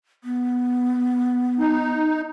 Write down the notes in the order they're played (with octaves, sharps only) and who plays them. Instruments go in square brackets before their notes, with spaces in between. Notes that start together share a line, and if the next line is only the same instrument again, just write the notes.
[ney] B3
[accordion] D#4